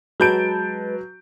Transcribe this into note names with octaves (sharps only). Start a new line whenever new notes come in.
F#3 G#3 B4 A5 G6 D7